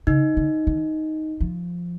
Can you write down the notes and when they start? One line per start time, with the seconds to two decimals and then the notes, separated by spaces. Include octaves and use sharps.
0.07 C#3 D#4
0.37 D3
0.67 D#3
1.40 F3